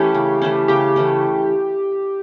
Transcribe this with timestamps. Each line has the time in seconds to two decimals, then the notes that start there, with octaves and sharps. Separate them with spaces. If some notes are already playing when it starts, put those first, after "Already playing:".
Already playing: E3 A3 C#4 G4
0.15 C#3
0.42 E3 A3 C#4
0.68 C#3 G4
0.96 E3 A3 C#4